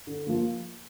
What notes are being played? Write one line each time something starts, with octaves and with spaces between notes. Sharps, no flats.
D3
F3 A#3